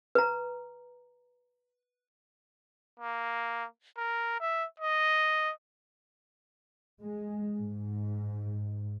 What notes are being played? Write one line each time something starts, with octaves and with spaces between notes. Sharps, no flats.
B4 A#5
A#3
A#4
E5
D#5
G#3
G#2